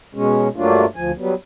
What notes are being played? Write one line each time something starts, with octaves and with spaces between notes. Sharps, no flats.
B2 G#3 C#4
G2 F#3 A3 A#3 D4 F4
D2 F3 G#5
F#3 G3 B3